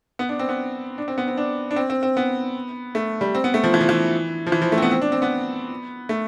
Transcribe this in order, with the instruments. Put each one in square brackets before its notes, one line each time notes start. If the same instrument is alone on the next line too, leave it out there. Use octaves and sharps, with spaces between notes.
[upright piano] B3
D4
C4
B3
D4
C4
B3
C4
D4
D4
C4
C4
C4
B3
A3
G3
C4
B3
A3
F3
E3
F3
E3
F3
E3
F3
A3
C4
B3
C4
D4
C4
B3
A3